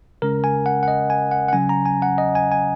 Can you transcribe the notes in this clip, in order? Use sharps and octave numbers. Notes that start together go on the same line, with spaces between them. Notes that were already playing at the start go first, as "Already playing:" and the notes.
C#3 G#3 C#4 A#4
G#5
F#5
F#5
D#5
G#5
F#5
F#5
C#3 F#3 C#4 G#5
A#5
G#5
F#5
D#5
G#5
G#5